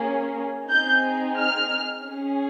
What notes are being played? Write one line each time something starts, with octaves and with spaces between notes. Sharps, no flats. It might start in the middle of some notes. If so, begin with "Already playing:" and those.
Already playing: A#3 C#4 G#4
C4 D#4 G#4 G6
F6
C#4 G#4